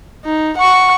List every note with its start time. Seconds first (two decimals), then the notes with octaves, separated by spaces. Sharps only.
0.25 D#4
0.57 F#5 C#6